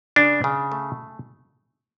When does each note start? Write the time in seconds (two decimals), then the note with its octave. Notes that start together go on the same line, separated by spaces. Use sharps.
0.16 C#3 D4
0.44 C#3
0.72 A3